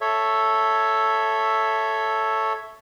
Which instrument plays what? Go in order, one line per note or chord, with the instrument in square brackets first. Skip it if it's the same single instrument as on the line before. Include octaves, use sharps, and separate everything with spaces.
[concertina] A4 C#5 E5